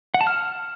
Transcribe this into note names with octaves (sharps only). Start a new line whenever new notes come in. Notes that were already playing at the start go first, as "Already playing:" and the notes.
F#5
A5
F6